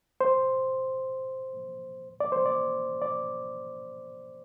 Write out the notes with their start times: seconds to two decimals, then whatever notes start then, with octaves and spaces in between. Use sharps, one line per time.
0.21 C5
2.20 D5
2.32 C5
2.46 D5
3.02 D5